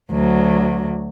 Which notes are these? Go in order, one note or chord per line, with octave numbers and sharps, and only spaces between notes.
D2 F#3